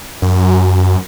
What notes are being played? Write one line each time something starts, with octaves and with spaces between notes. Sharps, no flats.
F#2